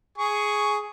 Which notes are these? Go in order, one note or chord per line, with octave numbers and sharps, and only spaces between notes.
G#4 C#6